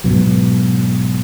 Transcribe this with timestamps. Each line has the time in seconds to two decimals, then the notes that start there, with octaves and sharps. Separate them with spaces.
0.04 G#2 B2 F#3